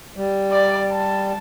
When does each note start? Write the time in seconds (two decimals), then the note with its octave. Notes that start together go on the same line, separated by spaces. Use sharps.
0.16 G3
0.52 D5
0.92 A5